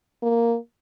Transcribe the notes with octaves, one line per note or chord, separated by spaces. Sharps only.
A#3